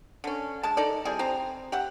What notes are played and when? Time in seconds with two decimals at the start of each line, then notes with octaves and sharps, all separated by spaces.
0.24 D3 C#4
0.63 G#3 A5
0.77 D#4 A4 D5
1.05 G3 C4 E4 G#4
1.19 C4 C5 A#5
1.72 G4 E5 F#5